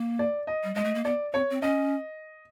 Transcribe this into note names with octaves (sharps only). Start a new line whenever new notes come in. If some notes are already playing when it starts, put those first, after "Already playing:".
Already playing: A#3
D5
D#5
G3
G#3 D#5
A3
A#3
B3 D5
C4 C#5
C4
C#4 D#5